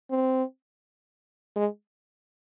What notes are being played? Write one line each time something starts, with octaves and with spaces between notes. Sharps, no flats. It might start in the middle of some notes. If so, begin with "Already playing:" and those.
C4
G#3